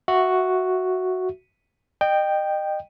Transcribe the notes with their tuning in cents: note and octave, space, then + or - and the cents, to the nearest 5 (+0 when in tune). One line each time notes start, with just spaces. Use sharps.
F#4 +0 E5 +0
D#5 -30 G5 +0